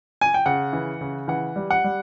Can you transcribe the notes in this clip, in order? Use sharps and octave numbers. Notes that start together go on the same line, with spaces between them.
G#5
G5
C#3 F#5
E3
C#3
E3 F#5
G3
F#5
G3